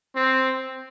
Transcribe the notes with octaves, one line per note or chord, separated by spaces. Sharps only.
C4